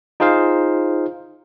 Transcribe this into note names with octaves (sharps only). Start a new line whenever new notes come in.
D#4 F4 G#4 C5 F5